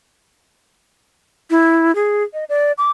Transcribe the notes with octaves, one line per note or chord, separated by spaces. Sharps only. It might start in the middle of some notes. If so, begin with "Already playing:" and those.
E4
G#4
D#5
D5
D6